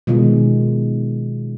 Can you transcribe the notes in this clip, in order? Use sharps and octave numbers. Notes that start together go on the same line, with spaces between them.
B2 D#3 G#3 F4